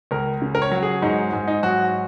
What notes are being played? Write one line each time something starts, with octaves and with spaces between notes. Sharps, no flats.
C#2 A#4
C#3
A#4
C#5
F#3
G#4
G#2 D#4
G#2
D#4
F#3 F#4